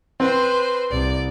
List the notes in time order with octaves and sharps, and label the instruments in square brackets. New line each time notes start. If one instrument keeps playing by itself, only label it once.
[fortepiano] C4 [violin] B4 C5
[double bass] C2 [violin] D5